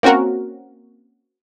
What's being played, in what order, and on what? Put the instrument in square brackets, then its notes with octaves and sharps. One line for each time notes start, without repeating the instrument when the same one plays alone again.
[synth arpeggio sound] A#3 C4 C#4 F#4 A#4